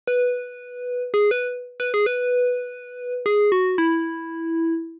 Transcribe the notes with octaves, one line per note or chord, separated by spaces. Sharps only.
B4
G#4
B4
B4
G#4
B4
G#4
F#4
E4